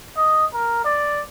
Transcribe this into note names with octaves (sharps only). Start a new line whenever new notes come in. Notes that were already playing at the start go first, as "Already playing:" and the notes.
D#5
A#4
D5